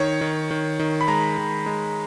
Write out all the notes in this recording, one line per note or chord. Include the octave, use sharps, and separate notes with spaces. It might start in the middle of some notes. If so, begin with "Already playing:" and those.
Already playing: D#3 C#5
D#3
D#3
D#3
B5
G#3 A#5
D#3
G#3